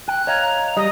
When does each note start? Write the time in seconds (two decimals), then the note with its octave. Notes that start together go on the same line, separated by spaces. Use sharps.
0.08 G5 F#6
0.27 C#5 D#5 F5 A#5
0.77 G3 D#5 D#6